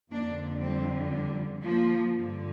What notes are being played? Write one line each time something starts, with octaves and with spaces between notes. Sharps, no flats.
F2 D3 A#3 D4
G3 C4
G3
F3 A#3
G2 D3